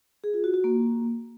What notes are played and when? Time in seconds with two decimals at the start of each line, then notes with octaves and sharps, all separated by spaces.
0.24 G#4
0.34 F4
0.44 F#4
0.54 F#4
0.64 A#3